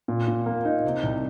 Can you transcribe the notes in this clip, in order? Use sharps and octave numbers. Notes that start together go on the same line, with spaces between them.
A#2
A#2
A#3
D#4
C3
C2